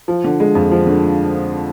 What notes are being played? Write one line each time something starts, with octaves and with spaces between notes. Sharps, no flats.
F3
D3
G#3
F2
F3
D3